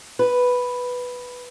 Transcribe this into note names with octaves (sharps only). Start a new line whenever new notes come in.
B4